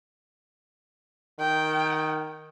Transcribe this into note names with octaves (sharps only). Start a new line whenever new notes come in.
D#3 G5